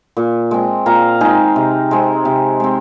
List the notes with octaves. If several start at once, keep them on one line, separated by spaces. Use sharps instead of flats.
A#2
G#3 C4
A#2 F5 A#5
G#3 C4 D#4 G#4
C3
G#3 C4
C3
G#3 C4